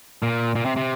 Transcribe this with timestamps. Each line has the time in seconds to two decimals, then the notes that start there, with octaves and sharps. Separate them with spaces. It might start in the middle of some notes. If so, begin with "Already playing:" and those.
0.23 A#2
0.55 A#2
0.65 C3
0.76 C3